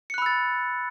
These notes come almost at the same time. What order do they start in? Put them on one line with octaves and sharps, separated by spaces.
C#7 F#6 B5 E6 A6